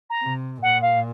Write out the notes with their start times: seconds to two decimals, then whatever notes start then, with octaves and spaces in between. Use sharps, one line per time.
0.10 A#5
0.22 C3
0.62 A#2 F#5
0.82 F5